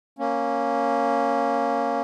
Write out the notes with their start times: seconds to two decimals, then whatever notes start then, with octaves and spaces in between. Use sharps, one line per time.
0.19 A#3 C#4